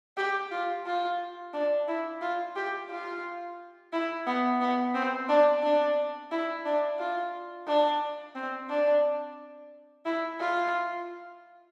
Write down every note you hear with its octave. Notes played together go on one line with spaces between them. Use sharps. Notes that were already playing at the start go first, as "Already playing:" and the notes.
G4
F4
F4
D4
E4
F4
G4
F4
E4
B3
B3
C4
D4
D4
E4
D4
F4
D4
C4
D4
E4
F4